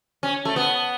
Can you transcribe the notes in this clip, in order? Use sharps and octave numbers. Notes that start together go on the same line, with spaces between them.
C#4
A3
B3